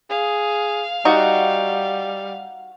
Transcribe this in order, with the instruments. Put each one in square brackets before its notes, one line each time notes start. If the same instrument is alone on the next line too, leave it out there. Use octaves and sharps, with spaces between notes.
[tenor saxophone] G#4 [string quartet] F5
[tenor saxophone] G3 [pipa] D#4 [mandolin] F#4